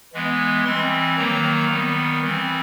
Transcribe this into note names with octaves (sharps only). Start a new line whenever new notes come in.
E3 G#3 B3
E3 G3 C4 C6
D#3 F#3 A#3 A#5
D#3 G3 B3
E3 G3 C4